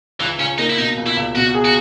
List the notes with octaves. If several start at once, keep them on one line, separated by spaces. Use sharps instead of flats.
C#2 E3
C#2 C#4
A#3 D#4
E4
B2 D#4
C#2
E4
C#2
B2 F#4
G#4
F#4